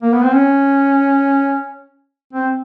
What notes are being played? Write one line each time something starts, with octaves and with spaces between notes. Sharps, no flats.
A#3
B3
C4
C#4
C4